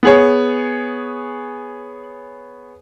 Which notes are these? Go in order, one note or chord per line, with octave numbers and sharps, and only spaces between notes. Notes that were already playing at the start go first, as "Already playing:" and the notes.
B3 G#4 C#5